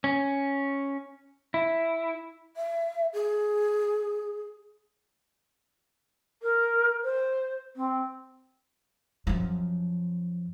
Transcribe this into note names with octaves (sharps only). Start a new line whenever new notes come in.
C#4
E4
E5
G#4
A#4
C5
C4
F#2 F3